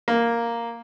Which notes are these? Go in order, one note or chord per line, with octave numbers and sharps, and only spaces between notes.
A#3